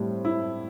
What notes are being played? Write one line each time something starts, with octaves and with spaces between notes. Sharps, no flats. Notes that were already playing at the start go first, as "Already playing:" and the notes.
Already playing: A2 G3 C4
E4